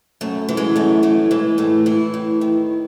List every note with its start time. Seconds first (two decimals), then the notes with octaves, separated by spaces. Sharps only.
0.21 F#2 A3
0.49 E3
0.57 G#3
0.76 F#2 A3
1.03 E3 A3
1.31 E3 G#3
1.58 A2 A3
1.86 E3 E4
2.14 A2
2.41 D#3